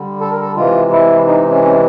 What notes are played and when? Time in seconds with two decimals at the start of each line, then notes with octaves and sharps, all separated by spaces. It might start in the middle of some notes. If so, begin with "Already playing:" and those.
Already playing: D3 G3
0.21 A4
0.31 A#4
0.41 A4
0.56 C3 E3 G#3 F4
0.92 E4
1.27 D#4
1.51 C#4
1.64 C#4